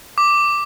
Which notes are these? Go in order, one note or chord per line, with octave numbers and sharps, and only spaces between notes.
D6